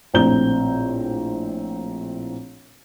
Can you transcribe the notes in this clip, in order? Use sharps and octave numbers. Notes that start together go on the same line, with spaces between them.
A#1 A2 C4 A#5 G6 G7